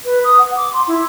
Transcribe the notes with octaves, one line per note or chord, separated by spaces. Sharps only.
B4
D#6
F#5
D6
C6
E4